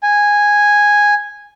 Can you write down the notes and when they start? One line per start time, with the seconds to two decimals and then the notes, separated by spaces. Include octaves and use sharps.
0.03 G#5